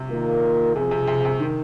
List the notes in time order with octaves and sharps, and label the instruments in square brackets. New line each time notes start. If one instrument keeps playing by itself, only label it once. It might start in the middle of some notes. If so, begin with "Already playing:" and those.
Already playing: [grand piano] C3
[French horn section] D#3 A#3 F4 A#4
[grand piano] C3 [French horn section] F3 C4 G#4
[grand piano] C3
C3
C3
D#3